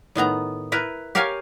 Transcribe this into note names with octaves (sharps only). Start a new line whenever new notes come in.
A2 D#3 B3 A#5
E4 A#4 B4
G4 A#4 C#5 F5 G5 G#5